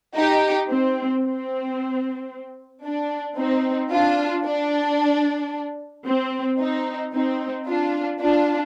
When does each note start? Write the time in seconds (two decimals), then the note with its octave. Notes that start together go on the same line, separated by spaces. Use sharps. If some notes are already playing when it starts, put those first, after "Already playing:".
0.16 D#4 G4
0.70 C4
1.24 C4
2.84 D4
3.38 C4 D#4
3.91 D4 F4
4.45 D4
6.06 C4
6.59 C4 D#4
7.13 C4 D#4
7.66 D4 F4
8.20 D4 F4